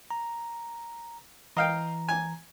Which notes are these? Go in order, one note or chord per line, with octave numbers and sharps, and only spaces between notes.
A#5
E3 D#5 F5 G5 A#5
G#5